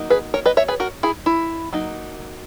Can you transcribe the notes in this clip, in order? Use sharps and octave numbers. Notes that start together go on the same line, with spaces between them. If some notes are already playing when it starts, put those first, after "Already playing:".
Already playing: F#3 A#3 D#4
G#4 B4
A#4 C#5
B4 D#5
C#5 E5
G#4 B4
F#4 A#4
E4 G#4
E4
F#3 A#3 D#4